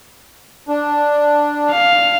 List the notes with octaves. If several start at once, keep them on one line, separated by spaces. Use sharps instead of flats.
D4
F5